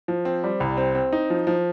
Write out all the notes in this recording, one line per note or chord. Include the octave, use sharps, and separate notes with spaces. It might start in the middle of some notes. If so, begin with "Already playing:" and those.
F3
C4
G3
C2
C4
C4
D#4
F3
F3